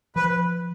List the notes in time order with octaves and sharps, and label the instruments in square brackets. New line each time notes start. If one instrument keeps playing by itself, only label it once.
[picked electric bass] F3 [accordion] B4